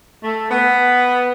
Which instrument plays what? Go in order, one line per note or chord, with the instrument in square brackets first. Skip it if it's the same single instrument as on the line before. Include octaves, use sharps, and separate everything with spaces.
[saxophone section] A3
B3